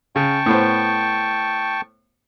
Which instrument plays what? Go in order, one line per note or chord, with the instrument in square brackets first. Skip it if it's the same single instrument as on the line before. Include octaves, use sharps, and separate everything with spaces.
[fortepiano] C#3 [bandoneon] G5 A5 C#6
[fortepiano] A2 B3 C5